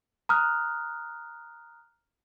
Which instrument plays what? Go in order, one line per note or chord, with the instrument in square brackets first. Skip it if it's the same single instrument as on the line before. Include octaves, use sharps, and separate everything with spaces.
[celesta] A#5 D#6 F6 F#6